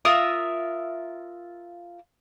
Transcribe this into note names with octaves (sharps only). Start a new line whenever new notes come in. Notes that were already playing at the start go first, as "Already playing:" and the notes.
F4 A#4 E5 D#6